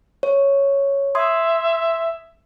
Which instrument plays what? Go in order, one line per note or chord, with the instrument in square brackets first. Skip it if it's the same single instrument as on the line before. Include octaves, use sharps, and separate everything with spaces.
[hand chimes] C#5
[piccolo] E5 [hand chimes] C6 D#6 G#6